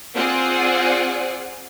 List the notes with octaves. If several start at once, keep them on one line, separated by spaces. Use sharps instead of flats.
C4 F4 G#4 C5 D5 F#5